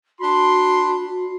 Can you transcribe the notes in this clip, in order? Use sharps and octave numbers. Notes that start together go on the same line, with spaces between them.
D4 F#4 B5 C6